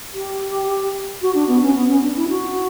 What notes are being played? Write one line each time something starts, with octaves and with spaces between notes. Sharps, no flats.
G4
F#4
D4
B3
C#4
B3
C#4
D4
E4
F#4